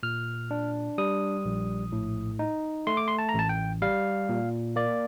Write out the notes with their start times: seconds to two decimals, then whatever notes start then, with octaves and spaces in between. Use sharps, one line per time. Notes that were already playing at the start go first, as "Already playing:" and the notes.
0.03 A#2 F6
0.51 D4
0.98 G3 D#6
1.45 A#1
1.92 A2
2.39 D#4
2.87 A3 C6
2.97 D6
3.08 C6
3.19 A5
3.29 A#5
3.34 A1 A5
3.49 G5
3.82 G3 F5
4.29 A#2
4.76 A#3 D5